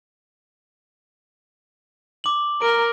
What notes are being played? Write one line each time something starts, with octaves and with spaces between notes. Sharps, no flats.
D6 F#7
A#4 D7